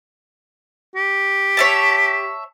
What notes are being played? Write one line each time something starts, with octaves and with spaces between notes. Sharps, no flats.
G4
C#5 E5 A5